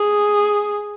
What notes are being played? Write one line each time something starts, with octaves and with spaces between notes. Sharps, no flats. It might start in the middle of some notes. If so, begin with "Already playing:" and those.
Already playing: G#4